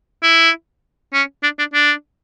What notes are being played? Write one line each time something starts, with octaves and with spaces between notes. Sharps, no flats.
E4
C#4
D4
D4
D4